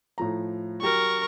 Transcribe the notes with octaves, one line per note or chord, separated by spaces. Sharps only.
A2 F3 A#5
F#3 G4 A#4 C#6